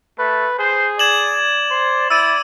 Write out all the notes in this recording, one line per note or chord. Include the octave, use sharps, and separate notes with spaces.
A3 B4
G#4 C5
D5 G#6 E7 F#7
C5
E4 D5 E6 D#7